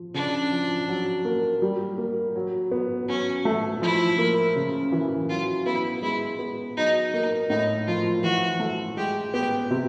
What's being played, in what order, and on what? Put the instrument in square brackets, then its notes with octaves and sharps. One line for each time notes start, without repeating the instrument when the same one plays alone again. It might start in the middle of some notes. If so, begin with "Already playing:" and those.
Already playing: [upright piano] F3
[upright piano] C#3 [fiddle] D4
[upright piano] F3
F#3
A#3
G3
A#3
F#3
B3
[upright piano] F#3 [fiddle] C#4
[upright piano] A3
[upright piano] F3 [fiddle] E4
[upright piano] A#3
C#3
E3
[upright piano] F#3 [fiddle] F4
[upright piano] B3 [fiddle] E4
[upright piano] G#3 [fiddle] E4
[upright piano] B3
[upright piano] F#3 [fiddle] D#4
[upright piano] A#3 [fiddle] D#4
[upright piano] A2 [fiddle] D#4
[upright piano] F3 [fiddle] F4
[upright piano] E3 [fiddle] F#4
[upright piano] A3
[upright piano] G#3 [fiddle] G4
[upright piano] B3 [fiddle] G4
[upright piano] C3